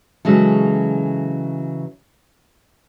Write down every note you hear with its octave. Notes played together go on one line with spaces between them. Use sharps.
C#3 E3 F#3 G#3 A4